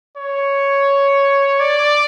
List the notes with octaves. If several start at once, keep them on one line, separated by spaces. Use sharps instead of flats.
C#5
D5